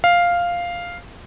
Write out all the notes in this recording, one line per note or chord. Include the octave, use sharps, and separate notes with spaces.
F5